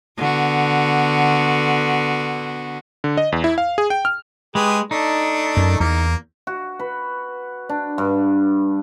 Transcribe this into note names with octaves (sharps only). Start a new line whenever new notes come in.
D3 B3 F#4
D3
D#5
E2
E4
F5
G#4
G5
F6
G#3 G4 G#4 B4
A3 D4 D#4
F#2
E2 A#3
F#4
B4
D4
G2